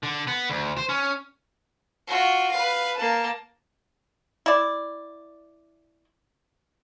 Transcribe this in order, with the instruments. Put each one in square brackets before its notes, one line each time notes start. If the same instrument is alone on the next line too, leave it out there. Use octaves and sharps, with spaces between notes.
[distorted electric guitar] D3
B3
D2
C5
C#4
[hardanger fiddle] F4 F#4
B4 F5
A#3 A5
[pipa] E4 D5